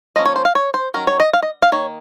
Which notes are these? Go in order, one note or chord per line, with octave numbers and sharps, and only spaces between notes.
F3 A#3 C#4 D#5
C#5
C5
F5
C#5
C5
D#3 F#3 C#4 A#4
C#5
D#5
F5
D#5
F5
D#3 A#3 C#5